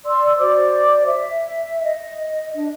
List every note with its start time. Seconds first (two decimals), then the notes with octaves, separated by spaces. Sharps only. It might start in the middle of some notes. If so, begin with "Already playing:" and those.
0.05 D5 C6 E6
0.38 F#4 C5 D5 D6
1.06 E5
1.84 D#5
2.55 D4 D#5